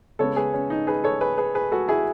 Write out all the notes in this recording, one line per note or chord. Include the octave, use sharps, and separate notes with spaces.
C#3 G#3 B3 A4 C#5
G#4 B4
C#4
D#4
G#4 B4
A4 C#5
G#4 B4
G#4 B4
G#4 B4
F#4 A4
E4 G#4